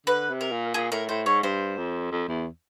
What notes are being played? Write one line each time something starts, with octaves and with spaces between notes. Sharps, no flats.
D3 B4
C3
A#4
A#2
A#2 G#4
A2 A#4
A2 C5
G#2 C#5
G2 C5
F2
F2
E2